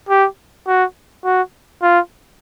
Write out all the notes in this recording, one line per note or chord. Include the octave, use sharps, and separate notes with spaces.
G4
F#4
F#4
F4